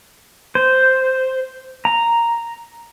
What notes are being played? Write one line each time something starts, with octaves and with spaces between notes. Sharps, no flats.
C5
A#5